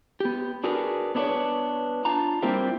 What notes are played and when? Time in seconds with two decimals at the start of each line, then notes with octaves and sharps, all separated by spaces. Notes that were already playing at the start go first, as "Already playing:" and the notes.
0.20 B3 G4
0.64 D4 F#4 G#4 A#4 B4
1.15 B3 C#4 D4 E4 B4 C#5
2.05 D4 F4 A5 A#5
2.42 G3 A#3 C4 E4 F4 G4